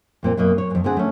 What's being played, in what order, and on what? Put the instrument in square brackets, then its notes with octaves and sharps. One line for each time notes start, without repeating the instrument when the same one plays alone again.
[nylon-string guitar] F2 A#2 C4
F#2 B2 A#3 D#5
C#5
F2 G#2
D2 C4 G#4 F#5
A3 C#4